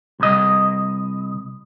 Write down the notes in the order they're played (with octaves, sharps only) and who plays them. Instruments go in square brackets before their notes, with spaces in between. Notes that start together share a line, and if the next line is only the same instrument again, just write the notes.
[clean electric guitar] C2 D#5